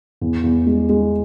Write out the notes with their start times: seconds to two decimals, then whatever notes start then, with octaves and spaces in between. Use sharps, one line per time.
0.21 E2
0.43 E2
0.66 G#3
0.89 G#3